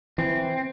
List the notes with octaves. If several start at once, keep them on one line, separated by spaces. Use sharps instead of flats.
E3 C4